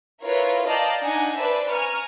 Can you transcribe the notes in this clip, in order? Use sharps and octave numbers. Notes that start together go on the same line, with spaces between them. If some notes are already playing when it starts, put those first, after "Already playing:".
E4 F4 A#4 B4 C#5
D5 D#5 F5 G5 A5 A#5
D4 D#4 F#5 G#5
B4 C5 D5 E5 A5
G#5 A#5 C#6 F6